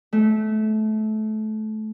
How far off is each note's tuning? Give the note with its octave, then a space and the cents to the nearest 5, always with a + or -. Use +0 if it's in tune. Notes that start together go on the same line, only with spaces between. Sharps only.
A3 -25